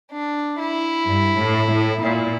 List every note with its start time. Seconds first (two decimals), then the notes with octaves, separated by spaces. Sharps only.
0.12 D4
0.59 E4
1.07 G2
1.38 A2
1.70 A2
2.02 A#2 E4